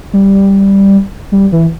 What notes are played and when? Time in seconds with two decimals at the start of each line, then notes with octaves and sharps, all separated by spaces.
0.13 G3
1.32 G3
1.52 E3